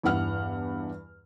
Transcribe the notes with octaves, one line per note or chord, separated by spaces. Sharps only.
E2 G2 E4 F#5 F6